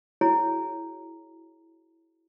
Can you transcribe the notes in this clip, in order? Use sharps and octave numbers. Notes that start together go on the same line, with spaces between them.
E4 F#4 G#4 C#5 A#5